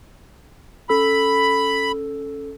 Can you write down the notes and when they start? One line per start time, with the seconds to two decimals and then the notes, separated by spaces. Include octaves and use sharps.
0.89 C#4 A4 B5 E6